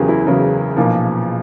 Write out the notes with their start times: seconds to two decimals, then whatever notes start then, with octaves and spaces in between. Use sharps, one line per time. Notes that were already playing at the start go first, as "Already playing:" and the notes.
Already playing: F#1 E2 C#3 F#3 G4 G#4
0.09 E4
0.25 F#1 E2 C#3 F#3
0.76 B1 A#2 F3